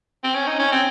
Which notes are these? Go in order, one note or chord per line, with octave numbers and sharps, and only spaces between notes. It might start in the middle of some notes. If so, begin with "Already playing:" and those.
C4
C#4
D#4
C#4
C4